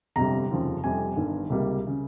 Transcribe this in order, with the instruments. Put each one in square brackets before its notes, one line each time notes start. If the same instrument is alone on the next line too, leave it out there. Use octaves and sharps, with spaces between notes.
[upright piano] G1 F2 C3 G3 A#5
F1 D#2 C#3 F3
F1 F2 C3 G3 G#5
G1 G2 D#3
C#2 C3 G3 A#3
C#3